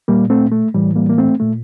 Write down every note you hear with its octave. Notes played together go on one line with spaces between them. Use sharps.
A#2 G3 A#3
A3 C4
A3
A2 E3 G3
G3 A#3
A#3
A3 C4
A#2 A3